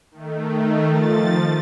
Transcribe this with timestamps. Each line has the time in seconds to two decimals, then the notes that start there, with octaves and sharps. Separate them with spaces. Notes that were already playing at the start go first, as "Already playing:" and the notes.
0.11 D#3 A3
0.89 F3 A6